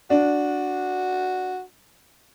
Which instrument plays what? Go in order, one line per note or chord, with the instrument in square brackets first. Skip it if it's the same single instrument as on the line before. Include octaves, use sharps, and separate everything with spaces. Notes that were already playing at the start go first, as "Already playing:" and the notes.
[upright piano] D4 [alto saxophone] F#4